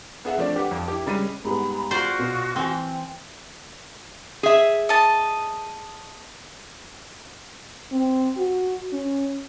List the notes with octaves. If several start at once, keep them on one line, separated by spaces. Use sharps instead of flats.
B3 G#4 E5 F#5
F3 A3 C4 D4 D5
G4 B4 F#5
F2
E4 G4
C#3 G3 G#3 B5 D#7
G#2 G3 B3 B5
F4 F#4 C5 D5 C#6
B2
E3 C4 G#5
G#4 E5
D#5 A5
C4
F#4
C#4